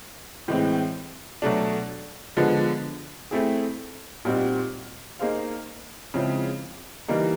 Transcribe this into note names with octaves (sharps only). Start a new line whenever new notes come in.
A2 E3 G#3 C4
B2 F#3 A3 D4
D3 F3 G#3 B3
A3 C4 E4 G#4
A#2 G3 C4 D#4 F#4
A#3 D#4 G#4 C5 F5
C#3 F3 G#3 C4 E4
E3 G3 A#3 D#4